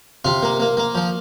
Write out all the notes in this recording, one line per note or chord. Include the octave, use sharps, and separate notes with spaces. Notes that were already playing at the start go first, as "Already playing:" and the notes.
C3 F4
A#3
A#3
A#3
F3